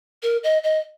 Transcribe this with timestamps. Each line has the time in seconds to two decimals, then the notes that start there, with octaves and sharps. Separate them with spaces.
0.22 A#4
0.43 D#5
0.64 D#5